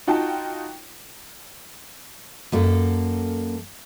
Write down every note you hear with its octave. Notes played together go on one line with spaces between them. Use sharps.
D#4 F4 F#4 G5 A5
F#2 A#3 A4